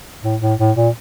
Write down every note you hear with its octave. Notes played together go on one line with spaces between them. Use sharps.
A2
A2
A2
A#2